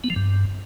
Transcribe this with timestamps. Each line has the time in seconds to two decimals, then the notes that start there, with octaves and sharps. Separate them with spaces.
0.04 B3
0.10 F3
0.16 G2